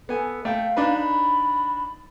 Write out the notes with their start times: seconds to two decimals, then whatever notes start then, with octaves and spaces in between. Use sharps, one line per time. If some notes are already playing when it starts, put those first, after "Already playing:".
0.09 B3 A4 G#5
0.45 A3 F5 G5
0.77 D4 D#4 B4
0.98 B5